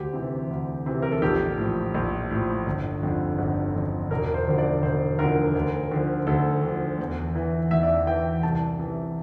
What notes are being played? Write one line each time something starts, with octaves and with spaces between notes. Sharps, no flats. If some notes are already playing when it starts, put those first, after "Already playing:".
Already playing: D2 G4
C3 E3
D2
C3 E3
A#4
A4
A#1 G4
A2 F3
A#1
A2 F3
G1
F2 D3
G1
F2 D3
E1 A#4
C5
D2 D3 F3
D5
E1 C5
D2 D3 F3 A#4
D2
D3 F3
D2 A4
D3 F3
E2
E3
E2 E5
D5
E5
E3 G5
C2 A5
C3 E3